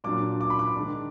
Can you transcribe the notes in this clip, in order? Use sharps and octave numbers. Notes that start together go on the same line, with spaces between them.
A#2 F#3 D4 D6
D6
B5
D6
D#3 G#3 D4